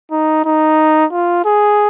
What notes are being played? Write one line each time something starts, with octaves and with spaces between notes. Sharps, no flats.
D#4
D#4
F4
G#4